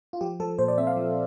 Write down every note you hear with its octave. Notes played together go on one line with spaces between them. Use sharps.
F4
F3 G4
F3 A4
A#2 C5
D5
C4 E5
F5
F3